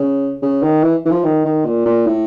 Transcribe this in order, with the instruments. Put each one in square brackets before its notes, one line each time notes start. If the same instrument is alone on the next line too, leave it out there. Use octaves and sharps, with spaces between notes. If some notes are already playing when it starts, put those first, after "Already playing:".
Already playing: [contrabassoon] C#3
C#3
D#3
E3
E3
F3
D#3
D#3
A#2
A#2
A2